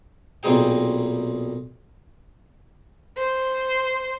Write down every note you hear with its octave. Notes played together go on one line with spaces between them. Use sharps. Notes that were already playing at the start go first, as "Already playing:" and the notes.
B1 A#2 C4 D#4 G#4 G5
C5